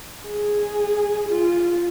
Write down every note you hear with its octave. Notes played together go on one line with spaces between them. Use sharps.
G#4
F4